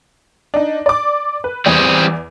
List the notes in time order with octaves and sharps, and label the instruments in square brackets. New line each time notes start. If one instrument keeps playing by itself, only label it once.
[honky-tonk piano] D4 D#4
D5 D6
B4
[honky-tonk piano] E2 D5 [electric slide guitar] G3 C4 G#4